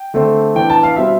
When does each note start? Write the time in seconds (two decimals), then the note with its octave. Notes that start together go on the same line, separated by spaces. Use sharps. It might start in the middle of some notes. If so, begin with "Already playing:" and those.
Already playing: G5
0.14 D3 A3 C4
0.55 E3 B3 D4 G5
0.70 A5
0.83 F5
0.96 B2 G3 C4 E5